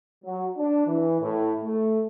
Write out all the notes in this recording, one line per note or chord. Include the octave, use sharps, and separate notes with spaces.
F#3
D4
E3
A2
A3